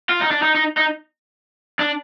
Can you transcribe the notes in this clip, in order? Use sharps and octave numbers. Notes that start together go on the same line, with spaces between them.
F4
D#4
D4
D#4
D#4
D#4
D4